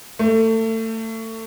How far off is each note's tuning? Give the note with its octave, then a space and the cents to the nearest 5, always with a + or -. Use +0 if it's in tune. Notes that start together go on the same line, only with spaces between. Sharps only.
A3 +30